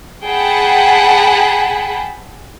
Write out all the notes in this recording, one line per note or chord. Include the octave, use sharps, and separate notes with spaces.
G#4 F#5 G5 A5 B5